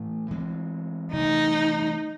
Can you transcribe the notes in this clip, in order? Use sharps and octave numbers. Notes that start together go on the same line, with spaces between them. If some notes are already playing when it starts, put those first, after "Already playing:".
Already playing: A2 E3 A3
E3 G#3 C4
C3 E3 A3 D#4